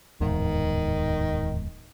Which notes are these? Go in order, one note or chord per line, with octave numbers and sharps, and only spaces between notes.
D1 E2 G#2 D#3